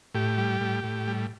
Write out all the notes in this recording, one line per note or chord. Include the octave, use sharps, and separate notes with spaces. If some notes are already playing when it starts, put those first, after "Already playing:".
A2 G4
G3
A2
A2
G3